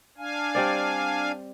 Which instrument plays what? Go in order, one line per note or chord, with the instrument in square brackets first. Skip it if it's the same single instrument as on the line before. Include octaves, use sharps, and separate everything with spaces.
[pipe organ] D4 F5 G#5
[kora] G3 C4 D5